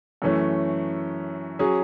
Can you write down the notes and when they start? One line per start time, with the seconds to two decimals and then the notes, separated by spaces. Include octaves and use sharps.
0.22 F#2 E3 A3 C#4
1.59 F#3 C#4 G#4